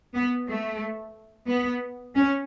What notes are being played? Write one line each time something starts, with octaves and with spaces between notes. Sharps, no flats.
B3
A3
B3
C#4